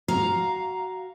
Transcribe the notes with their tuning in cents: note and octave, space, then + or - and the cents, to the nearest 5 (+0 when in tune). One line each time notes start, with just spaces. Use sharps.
F#4 +10 F5 +0 A#5 +5